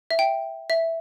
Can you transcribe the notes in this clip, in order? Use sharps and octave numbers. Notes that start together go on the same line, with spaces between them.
E5
G5
E5